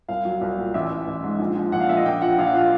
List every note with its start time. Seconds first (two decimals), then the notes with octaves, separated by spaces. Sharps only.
0.09 C2 F5
0.25 F#3
0.41 C2
0.58 A#2
0.74 A1 E5
0.91 E3
1.07 A1
1.24 G#2
1.39 A#1
1.56 F3
1.72 A#1 F#5
1.80 F5
1.89 A#2 E5
1.97 D#5
2.05 A#1 G5
2.22 F3 F#5
2.38 A#1 F5
2.47 F#5
2.54 A#2 F5